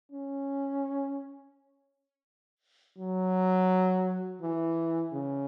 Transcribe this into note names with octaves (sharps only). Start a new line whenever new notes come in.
C#4
F#3
E3
C#3